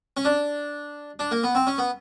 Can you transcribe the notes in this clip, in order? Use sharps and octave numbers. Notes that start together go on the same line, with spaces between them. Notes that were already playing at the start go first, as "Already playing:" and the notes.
C#4
D4
D4
A#3
B3
C4
C#4
B3